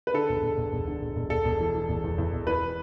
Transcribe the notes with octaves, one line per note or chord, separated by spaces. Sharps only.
B4
D3 A4
E1
E1
E1
E1
D3
E1
E1
E1 A4
E1
E3
E3
E1
E2
E2
E1
E3 B4